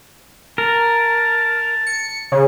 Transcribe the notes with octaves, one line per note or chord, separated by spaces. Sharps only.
A#4 A5
C#7
C#3